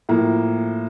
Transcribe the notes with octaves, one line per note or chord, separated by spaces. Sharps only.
A2 F3 A#3